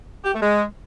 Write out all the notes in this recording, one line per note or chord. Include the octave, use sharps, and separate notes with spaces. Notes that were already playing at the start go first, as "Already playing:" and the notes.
G4
A3
G#3